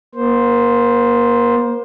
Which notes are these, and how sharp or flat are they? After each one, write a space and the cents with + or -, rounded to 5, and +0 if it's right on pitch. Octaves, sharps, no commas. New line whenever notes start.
A#3 +30 C5 +0